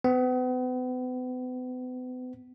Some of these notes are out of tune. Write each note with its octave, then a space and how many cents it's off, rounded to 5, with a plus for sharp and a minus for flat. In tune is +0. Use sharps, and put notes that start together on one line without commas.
B3 +40